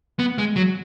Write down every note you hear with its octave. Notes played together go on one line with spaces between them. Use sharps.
B3
G#3
F#3